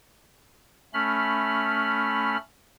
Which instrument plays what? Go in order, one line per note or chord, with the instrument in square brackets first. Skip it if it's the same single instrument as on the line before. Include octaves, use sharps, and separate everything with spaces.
[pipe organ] A3 C#4 B5 F6